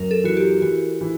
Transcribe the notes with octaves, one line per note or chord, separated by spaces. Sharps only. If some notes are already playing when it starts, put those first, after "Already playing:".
Already playing: F#2 A#4
A4
E3 F#4
G4
E3 F#4
E3